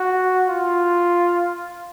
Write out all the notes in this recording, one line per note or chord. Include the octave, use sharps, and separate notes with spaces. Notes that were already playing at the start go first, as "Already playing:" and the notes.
Already playing: F#4
F4